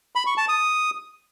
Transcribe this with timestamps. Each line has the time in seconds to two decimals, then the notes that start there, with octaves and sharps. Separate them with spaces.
0.16 B5
0.27 C#6
0.38 A5
0.49 D#6